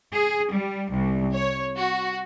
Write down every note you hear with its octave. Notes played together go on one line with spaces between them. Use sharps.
G#4
G3
C2
C#5
F#4